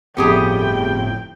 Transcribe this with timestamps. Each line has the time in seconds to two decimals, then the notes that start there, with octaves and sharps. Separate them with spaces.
0.17 G1 F2 A2 B3 G4 G#4 G5